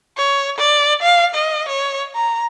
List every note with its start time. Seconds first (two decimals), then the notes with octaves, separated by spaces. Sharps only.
0.17 C#5
0.58 D5
1.02 F5
1.35 D#5
1.68 C#5
2.15 A#5